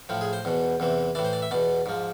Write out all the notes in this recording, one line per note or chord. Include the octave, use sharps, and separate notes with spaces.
A2 F3
G#4
C5
E2 B2
E2 C3 E3
A2 E3 D5
C5
D5
E5
E2 B2 D5
G#2 F3